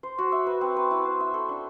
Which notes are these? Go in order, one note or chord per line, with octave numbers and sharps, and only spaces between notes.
C5
F#4
E5
B4
C4
B4
E4
C5
E5
A4
D4